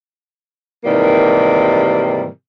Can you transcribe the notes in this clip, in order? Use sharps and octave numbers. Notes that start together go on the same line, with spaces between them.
G#2 C3 D#3 E3 G3 A#3